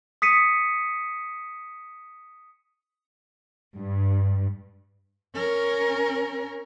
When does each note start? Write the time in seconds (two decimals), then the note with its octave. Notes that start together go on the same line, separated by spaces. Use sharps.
0.22 D#6 B6 C#7 D#7
3.72 G2
5.35 C#4 A#4